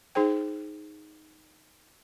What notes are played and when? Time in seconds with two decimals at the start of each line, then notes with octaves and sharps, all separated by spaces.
0.15 D#4 G#4 C5 G5